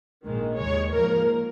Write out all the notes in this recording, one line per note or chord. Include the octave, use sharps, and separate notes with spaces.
A#1 G#2 D#3 G#3
D#2 D#3 G#3 C#5
G#2 F3 A#3 A#4